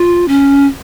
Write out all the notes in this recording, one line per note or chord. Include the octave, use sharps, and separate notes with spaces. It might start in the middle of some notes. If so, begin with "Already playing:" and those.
Already playing: F4
C#4